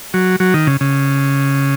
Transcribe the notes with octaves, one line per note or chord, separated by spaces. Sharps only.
F#3
F#3
D#3
C#3
C#3